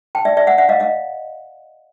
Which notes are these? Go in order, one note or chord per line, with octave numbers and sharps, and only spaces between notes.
G5 A5
D5 E5
D5 E5
E5 F#5
E5 F#5
D#5 F5
D#5 F5